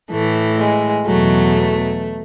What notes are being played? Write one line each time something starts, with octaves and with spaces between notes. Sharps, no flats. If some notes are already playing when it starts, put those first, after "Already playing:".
A2 E3 A3
G#3
E2 B2 F#3 A3